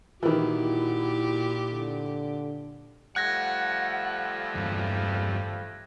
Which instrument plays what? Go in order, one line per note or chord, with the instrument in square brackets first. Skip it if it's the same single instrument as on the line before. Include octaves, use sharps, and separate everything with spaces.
[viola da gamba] A#2 G4 [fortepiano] D#3 E3 [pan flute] E4 [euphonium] F#4
[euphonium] D3
[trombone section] F3 G3 A3 [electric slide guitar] F#5 [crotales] F#6 G#6 A#6
[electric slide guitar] E2 G2